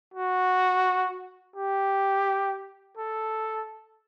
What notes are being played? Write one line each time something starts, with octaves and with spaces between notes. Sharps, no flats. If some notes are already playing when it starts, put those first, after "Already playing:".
F#4
G4
A4